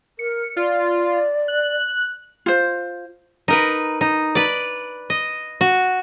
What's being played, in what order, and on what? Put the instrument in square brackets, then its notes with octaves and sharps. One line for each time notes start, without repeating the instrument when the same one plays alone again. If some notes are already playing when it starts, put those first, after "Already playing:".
[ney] A#4 [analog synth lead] C#7
[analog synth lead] F4 [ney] D5
[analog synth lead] F#6
[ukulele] F4 C5
[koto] D#4 A#4 B4
D#4
B4 D5
D#5
F#4